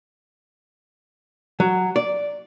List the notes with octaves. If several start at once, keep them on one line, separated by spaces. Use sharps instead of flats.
F#3
D5